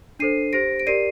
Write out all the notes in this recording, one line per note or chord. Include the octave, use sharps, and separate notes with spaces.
D4 A4 C5 C7 D#7
G4 C5 A#6 D7
D7
G4 A#4 D5 C7 D#7